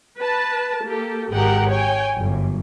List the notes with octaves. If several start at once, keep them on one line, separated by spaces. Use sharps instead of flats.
B4 A5
A#3 G4 A4
G#1 G4 G#4 A#4 F#5 G5
C#5 G5 G#5
G1 F#2